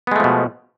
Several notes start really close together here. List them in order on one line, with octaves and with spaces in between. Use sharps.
B3 G#3 A3 F3 B2